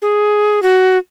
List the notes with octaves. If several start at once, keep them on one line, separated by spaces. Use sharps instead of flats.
G#4
F#4